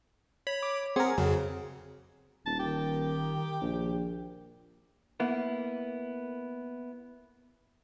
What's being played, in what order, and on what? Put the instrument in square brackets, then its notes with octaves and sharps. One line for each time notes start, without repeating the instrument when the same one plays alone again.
[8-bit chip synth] C#5 [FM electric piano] B5
[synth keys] D6
[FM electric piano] C4 A#4 [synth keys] G#4 [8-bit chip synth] F#5
[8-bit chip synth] F2 C#3 [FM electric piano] F#3
[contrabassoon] D#1 [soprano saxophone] A5
[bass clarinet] D#3 [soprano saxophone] G4
[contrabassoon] A#1
[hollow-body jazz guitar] A#3 B3 E4